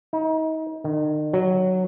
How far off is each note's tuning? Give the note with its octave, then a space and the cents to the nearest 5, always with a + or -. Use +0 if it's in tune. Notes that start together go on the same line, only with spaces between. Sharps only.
D#4 +35
D#3 -40
F#3 +0